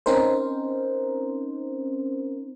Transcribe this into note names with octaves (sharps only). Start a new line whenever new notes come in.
C4 C#4 D#4 A#4 C5